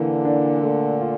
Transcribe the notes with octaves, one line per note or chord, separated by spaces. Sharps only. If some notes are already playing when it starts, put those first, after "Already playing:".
Already playing: A#2 D3 E3
D4
A3
F4